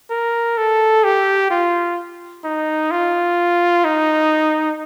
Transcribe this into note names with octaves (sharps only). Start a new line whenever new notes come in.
A#4
A4
G4
F4
D#4
F4
D#4